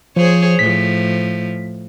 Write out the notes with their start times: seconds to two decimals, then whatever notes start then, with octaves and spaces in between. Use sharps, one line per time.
0.16 F3 G#4 C5 C#5
0.59 A2 F3 B6